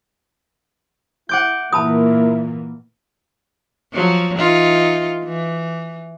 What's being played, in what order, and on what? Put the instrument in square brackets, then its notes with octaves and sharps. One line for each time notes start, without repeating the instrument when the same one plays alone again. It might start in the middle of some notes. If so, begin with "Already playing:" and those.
[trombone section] E4 [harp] F#5 D6 G6
[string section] A#2 E3 A#3 [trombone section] E4 A#4 [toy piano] A5 B5 D#6
[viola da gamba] F3 F#3
E3 D#4 F4
E3